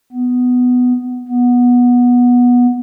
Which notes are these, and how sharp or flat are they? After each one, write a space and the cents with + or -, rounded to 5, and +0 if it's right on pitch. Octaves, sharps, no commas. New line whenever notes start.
B3 +10
B3 -15